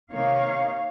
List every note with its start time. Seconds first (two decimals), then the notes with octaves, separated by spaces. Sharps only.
0.11 C3 D#3 A#3 D#4 C#5 F5